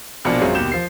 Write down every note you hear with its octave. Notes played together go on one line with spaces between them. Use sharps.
A#1 B2 F3 A#3 D4 C#7
F#2 F#3 G#3 C4 C#4 F4
D#2 B2 G4 G6 E7
F3 C7